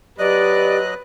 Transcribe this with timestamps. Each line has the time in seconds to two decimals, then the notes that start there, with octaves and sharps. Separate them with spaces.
0.19 F#3 G4 B4 D5 D#5 F#6